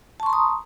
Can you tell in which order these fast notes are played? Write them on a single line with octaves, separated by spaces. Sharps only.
A5 C#6 C6 A#5 D#6